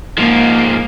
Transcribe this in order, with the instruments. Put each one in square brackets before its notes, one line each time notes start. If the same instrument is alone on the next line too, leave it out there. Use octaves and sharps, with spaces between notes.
[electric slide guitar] G#2 F3 [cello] A#3